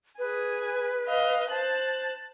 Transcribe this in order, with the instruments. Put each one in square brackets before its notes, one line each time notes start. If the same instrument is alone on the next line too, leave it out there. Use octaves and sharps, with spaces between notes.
[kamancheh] G#4 G#5 [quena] B4
[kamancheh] D#5 F5
[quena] C5 [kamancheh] A5 F#6